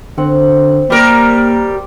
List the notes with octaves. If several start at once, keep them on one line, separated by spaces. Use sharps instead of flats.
D3 C4 F#5
G3 A#3 G4 A#4 D5 D#6